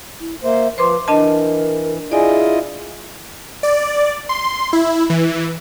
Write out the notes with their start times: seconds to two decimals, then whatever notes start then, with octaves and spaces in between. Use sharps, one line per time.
0.21 E4
0.44 A#3 C5 E5
0.78 F3 B4 C5 C6 D6
1.08 E3 D4 A#4 D#5 A5
2.12 E4 F4 G#4 D5 D#5 G#5
3.63 D5
4.29 C6
4.73 E4
5.10 E3